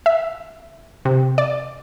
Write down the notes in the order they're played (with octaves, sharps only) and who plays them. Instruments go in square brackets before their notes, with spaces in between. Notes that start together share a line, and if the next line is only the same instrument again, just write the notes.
[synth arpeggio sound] E5
C3
D5